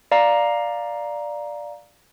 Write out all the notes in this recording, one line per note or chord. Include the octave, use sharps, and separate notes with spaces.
D5 F5 A#5